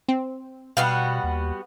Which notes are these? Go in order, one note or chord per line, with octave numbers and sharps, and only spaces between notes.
C4
B2 G3 B3 F#4 F5
D#2